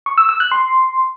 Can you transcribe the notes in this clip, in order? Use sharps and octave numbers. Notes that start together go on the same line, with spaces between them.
C#6
E6
E6
F#6
C6